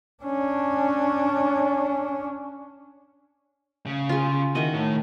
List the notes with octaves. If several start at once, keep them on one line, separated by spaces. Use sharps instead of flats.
C#4 D4
C#3
F4 G#4
D#3 E4 F#4 D#5
A2